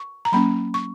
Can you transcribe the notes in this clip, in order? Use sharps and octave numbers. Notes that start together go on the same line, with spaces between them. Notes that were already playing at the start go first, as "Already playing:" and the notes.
Already playing: C#6
A#5
F#3 A#3 C#4 B5
C#6